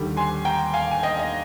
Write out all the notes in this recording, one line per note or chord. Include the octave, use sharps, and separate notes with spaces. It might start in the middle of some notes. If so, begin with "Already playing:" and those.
Already playing: D#2 D3 G3
G#5 C6
G5 A#5
F5 G#5
G#5
D#5 G5
D#5